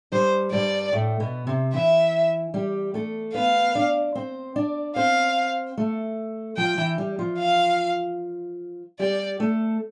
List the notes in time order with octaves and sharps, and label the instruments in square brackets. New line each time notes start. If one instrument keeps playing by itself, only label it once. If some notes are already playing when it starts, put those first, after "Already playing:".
[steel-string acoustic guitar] G2 G3 [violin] C5
[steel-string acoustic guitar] G2 G3 [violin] D5
[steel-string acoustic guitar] A2 A3
B2 B3
C3 C4
[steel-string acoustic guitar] E3 E4 [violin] E5
[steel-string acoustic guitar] G3 G4
A3 A4
[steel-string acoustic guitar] B3 B4 [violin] F5
[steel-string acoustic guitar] D4 D5
C4 C5
D4 D5
[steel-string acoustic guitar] C4 C5 [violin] F5
[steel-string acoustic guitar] A3 A4
[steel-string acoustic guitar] F3 F4 [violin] G5
[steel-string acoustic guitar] E3 E4
G3 G4
F3 F4
[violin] F5
[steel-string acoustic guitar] G3 G4 [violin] D5
[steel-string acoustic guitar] A3 A4